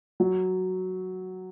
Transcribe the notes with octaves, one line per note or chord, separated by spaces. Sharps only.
F#3